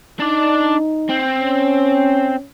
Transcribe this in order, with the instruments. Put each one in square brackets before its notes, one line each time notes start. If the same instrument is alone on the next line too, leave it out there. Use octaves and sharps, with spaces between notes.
[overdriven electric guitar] D4 D5 [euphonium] D#4
[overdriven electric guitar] C4
[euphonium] C#4